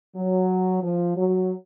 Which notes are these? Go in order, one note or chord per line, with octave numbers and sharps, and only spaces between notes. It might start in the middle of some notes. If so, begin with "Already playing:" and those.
F#3
F3
F#3